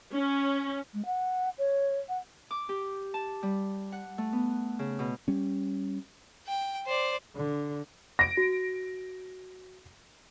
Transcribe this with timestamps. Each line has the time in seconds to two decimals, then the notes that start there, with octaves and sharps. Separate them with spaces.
0.12 C#4
0.93 G#3
1.05 F#5
1.58 C#5
2.08 F#5
2.51 D6
2.69 G4
3.14 A5
3.43 G3
3.92 F#5
4.18 A3
4.33 B3
4.79 C#3
4.99 B2
5.28 G3 C#4
6.47 G5
6.86 C5 D5
7.36 D3
8.19 A#6 D7
8.37 F#4